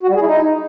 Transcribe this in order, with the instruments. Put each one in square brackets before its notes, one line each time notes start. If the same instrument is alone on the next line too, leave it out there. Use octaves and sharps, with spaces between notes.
[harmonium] F#4
G3
G#4
E4
D#4